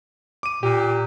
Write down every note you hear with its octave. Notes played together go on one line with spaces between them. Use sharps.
D6 D#7
A#2 G4